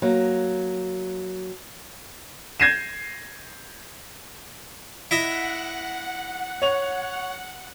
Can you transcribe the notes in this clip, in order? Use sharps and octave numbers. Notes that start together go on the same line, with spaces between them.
F#3 A#3
G6 G#6 A#6 C7 D#7 E7
E4 D#5 E5 F#5
C#5 F7